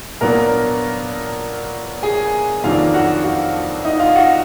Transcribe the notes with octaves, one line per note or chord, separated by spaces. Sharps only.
A#2 F#3 B3 D4 A#4 A#5
G#4 G#5
F2 D#3 F#3 A#3 D4 F4 F5
F#4 F#5
F#4 F#5
D#4 D#5
F4 F5
F#4 F#5